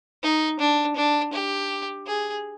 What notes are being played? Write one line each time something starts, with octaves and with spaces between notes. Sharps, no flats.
D#4
D4
D4
G4
G#4